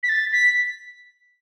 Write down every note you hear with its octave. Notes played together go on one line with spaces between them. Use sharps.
B6
A6
B6